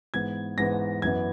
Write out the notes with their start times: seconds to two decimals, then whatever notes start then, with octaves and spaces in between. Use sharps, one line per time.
0.14 G#2 E3 B3 G#6
0.58 G#2 E3 B3 A#6
1.02 F#2 E3 B3 G#6